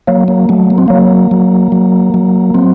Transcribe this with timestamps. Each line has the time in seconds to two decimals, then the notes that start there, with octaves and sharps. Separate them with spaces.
0.07 F#3 A#3
0.28 A#3
0.49 F#3 A3
0.70 A#3
0.78 C4
0.88 F#3 A#3
1.31 F#3
1.72 F#3
2.14 F#3
2.54 F#3 C4